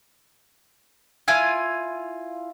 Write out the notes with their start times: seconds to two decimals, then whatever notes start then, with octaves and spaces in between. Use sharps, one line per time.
1.28 E4 F4 G#5